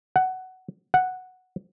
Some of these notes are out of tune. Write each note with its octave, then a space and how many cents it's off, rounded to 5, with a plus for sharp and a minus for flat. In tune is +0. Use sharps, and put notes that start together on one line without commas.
F#5 +15
F#5 +0